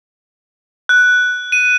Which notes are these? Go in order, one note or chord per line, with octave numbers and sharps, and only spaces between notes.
F#6
D#7